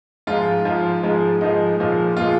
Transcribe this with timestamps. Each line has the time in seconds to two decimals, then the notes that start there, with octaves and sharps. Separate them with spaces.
0.27 G#2 F3 G#3 F4
0.65 G#2 F3 G#3
1.03 G#2 F3 G#3
1.41 G#2 F3 G#3 D#4
1.80 A#2 F3 G#3
2.17 A#2 F3 G#3 F4